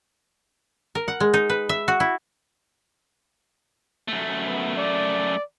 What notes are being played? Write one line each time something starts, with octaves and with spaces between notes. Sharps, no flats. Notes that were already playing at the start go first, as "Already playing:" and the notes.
A#4
F#5
G#3
D#4
B4
E5
F#4
E4
F#2 A3
B3
D5